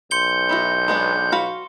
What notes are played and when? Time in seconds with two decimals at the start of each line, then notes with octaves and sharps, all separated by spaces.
0.11 B1 C6 G6 C#7 G7
0.49 B3 E4 F#4
0.88 G#3 B3 D4
1.32 F#4 F5 B5